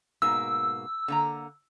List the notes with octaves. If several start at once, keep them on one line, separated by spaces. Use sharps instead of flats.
G#2 B2 A#3 E6
D3 A#3 A#5